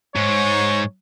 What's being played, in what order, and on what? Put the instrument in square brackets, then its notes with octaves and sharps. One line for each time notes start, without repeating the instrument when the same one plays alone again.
[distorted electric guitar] G#2 [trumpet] C#5